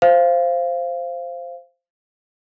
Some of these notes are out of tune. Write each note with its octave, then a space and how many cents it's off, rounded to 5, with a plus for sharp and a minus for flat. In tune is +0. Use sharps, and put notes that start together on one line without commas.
C5 +0 F5 -15